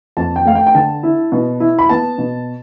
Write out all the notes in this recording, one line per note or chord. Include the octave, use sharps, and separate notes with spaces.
F2 A5
G5
A3 F5
G5
G5
D3 A5
E4
B2
E4
B5
B3 A5
B2